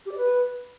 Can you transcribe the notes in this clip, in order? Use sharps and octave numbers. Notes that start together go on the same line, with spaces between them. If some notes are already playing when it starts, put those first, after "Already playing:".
G4
D5
B4